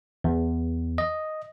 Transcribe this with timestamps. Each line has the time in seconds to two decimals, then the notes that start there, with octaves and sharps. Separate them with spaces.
0.24 E2
0.98 D#5